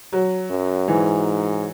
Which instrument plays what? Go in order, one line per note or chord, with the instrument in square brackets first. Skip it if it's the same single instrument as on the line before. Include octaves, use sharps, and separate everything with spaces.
[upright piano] F#3
[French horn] F#2
[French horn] G#2 [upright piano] E3